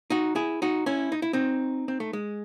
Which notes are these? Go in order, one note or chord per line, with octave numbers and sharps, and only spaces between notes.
D#4 F#4
E4 G#4
D#4 F#4
C#4 E4
D#4
E4
C4 D#4
C4
A3
G#3